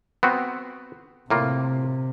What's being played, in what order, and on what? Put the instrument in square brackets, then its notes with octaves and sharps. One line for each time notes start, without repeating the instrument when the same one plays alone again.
[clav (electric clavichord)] B3 C4 F#4
[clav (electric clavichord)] A2 A#3 F4 [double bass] C3